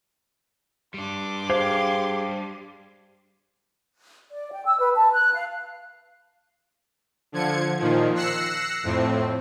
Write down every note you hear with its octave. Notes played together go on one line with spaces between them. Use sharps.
G3 D4 C6 D6
G4 G#4 C5 F5
D5
G5
E6
B4
A5
F#6
F5
D3 F3 G#6 C#7
A#2 D#3 F3
E6 F#6 A#6 C7 C#7 E7
F2 A2 C4